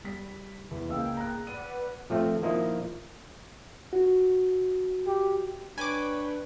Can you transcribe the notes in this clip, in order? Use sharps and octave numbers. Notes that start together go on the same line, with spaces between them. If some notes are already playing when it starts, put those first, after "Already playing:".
G3 B6
E2
C#2 A#3 G#4 F5 G5 E6
A#5 F#6
B4 D5 F#5 D#7
F3 A3 C4
F3 A#3 D#4 E4 D#5
F#4
G4
D4 B4 C#5 G5 G#5 B5 D6